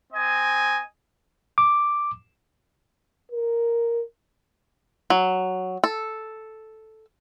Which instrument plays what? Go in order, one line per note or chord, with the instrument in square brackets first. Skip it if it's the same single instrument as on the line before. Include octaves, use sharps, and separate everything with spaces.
[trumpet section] C4 D#5 G#5
[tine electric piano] D6
[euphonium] A#4
[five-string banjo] F#3
A4